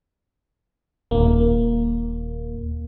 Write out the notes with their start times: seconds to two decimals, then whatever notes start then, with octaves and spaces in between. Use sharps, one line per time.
1.11 D#1 A#3